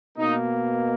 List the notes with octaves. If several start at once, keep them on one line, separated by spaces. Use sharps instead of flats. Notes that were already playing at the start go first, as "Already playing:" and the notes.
B2 A#3 D#4